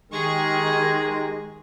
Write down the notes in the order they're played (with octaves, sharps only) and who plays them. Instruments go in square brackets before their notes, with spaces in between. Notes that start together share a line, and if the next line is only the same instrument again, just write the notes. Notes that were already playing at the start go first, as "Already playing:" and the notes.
[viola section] D#3 [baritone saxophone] G#3 [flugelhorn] G4 [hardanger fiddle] G#4 C#6